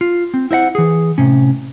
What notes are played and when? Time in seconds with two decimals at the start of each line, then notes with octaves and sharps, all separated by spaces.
0.01 F4
0.34 C4
0.51 E4 C5 D#5 F#5
0.75 E3 G#4
1.18 A2 C3 C#4